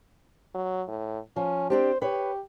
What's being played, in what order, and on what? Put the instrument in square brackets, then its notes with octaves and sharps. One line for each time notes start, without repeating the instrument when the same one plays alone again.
[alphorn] F#3
A2
[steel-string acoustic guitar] F3 [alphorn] C#4
[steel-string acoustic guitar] C4 D4 G4 [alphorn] C5
[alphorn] G4 [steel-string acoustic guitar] B4 C#5